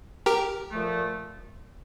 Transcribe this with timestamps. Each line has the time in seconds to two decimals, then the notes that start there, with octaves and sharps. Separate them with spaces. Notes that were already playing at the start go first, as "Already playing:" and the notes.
0.26 G4 A#4
0.70 A#2 F3 A3